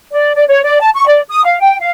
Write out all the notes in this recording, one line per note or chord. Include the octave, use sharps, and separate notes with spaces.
D5
D5
C#5
D5
A5
C#6
D5
D#6
F5
G5
F5